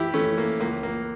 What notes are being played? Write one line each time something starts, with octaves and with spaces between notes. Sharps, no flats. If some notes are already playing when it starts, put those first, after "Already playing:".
Already playing: E3 E4 G4
E3 A3 C#4
A#3
C#2 A#3
A#3